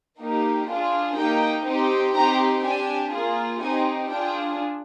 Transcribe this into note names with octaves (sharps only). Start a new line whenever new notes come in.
A#3 D#4 G4
D4 F4 G#4
A#3 D#4 G4 G5
C4 D#4 G4
C4 D#4 G4 A#5
D4 G4 G#5
A#3 F4 G#4
C4 D#4 G4 G#5
D4 F4 G#4 G5